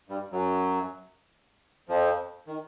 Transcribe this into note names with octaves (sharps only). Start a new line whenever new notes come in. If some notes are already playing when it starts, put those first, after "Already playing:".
G2 G3
F#2 F#3
F2 F3
D#3